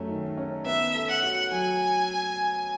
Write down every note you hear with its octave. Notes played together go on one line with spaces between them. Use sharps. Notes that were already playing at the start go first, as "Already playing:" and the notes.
Already playing: F#2 A3 C#4
D#3
C#4
B3 E5
A4
F#5
F#4
F#3 G#5